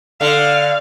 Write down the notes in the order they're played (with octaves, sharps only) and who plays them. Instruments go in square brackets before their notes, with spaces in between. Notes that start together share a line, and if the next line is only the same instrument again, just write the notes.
[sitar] D3 [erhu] F5